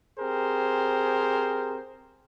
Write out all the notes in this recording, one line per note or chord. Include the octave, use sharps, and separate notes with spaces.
C4 G4 G#4 A#4 C5